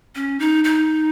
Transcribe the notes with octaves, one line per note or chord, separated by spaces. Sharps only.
C#4
D#4
D#4